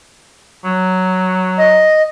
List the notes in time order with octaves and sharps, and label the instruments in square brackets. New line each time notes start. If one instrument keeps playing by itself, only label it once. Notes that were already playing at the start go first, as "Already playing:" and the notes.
[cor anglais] F#3
[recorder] D#5